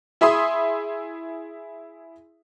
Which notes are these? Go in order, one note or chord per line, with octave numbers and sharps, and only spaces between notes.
E4 G#4 E5 B5 C6 D#6